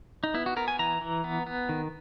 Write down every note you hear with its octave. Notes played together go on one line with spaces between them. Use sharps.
D#4
B3 E4
F#4
B3 A#4
G#5
E3 A#5
E3
B3
B3
D#3